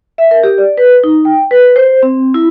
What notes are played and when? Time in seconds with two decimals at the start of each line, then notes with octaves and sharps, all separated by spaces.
0.18 E5
0.31 A#4
0.43 G4
0.58 D5
0.78 B4
1.04 D#4
1.25 G5
1.51 B4
1.76 C5
2.03 C4
2.34 E4